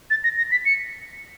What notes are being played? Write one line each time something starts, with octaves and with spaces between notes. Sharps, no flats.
A6
A#6
A#6
B6
C#7